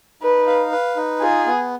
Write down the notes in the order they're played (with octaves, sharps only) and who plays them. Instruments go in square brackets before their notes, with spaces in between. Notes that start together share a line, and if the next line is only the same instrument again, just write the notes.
[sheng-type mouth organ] D#4 [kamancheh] B4
[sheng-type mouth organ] F5
B4
D#4
[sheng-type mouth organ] F4 [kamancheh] G#4
[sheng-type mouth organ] B3